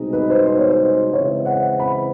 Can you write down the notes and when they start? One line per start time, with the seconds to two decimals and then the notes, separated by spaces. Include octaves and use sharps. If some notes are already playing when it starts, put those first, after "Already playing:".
Already playing: C2 B2 G#3 C4 D#4
0.13 B4
0.30 C5
0.46 C5
0.58 C#5
0.70 C5
1.13 C#3 E3 G#3 C4 E4 C#5
1.46 F#5
1.79 B5